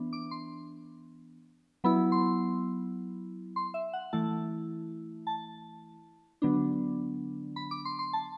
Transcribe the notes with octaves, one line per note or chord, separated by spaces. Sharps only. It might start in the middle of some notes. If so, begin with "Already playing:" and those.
Already playing: E3 B3 D4
D6
C6
F#3 B3 E4 B5
C6
C6
E5
F#5
E3 A3 E4 A5
A5
D3 F#3 B3 D4
B5
D6
C6
C6
A5